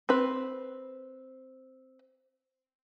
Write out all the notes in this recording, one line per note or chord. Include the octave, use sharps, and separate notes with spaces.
C4 B4